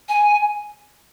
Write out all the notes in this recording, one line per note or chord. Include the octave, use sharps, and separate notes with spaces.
G#5